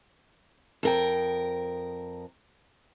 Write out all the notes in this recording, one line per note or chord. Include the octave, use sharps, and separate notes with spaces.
F2 A#4 G5